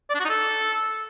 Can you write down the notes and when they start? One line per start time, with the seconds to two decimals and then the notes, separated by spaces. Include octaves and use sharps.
0.10 D5
0.15 D4
0.20 F#4
0.25 D#4
0.30 A4